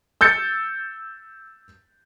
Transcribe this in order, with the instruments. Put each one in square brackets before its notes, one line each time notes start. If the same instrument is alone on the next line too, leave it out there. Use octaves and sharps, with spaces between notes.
[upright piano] E6 G6 A6 C#7